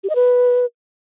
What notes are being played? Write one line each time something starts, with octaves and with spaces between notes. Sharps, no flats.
G4
D#5
B4